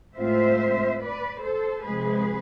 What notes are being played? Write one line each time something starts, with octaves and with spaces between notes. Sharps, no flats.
A2 G#3 C4 F4 C5 E5
B4 D5
A4 C5
C3 F3 G#3 G#4 B4